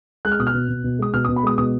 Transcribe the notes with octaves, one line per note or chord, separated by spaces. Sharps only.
G#3 F#6
F6
B2 D#6
F6
B2
B2
B2
G#3 D#6
B2 F6
D#6
B2
B5
G#3 D#6
B2 D#6